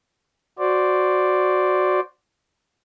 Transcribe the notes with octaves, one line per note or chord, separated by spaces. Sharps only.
F#4 C5 D5